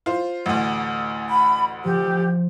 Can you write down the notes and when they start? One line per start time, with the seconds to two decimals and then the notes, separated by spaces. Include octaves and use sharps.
0.06 F4 C5
0.46 A1 D2
1.30 B5
1.85 F3 G4